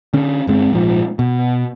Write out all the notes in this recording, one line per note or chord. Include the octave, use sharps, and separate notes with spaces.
D3 C#4
G1 G#3 C4
A#1 G#2 F3
B2